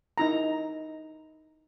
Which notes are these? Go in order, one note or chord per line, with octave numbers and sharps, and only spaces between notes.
D#4 E4 A#5